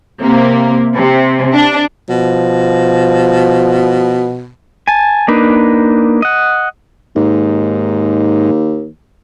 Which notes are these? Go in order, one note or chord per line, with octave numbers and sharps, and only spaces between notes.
C3 A#3
C3
D4
B2 F3
G#5 A5
A#3 D4 D#4 B4
D#5 F#5
D#2 G#2